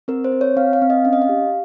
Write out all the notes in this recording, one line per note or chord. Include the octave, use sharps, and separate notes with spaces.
C4 A#4
C5
C4
C#5
C4 F5
F5
C4
D#5
C#4 F5
D#5
F5
G4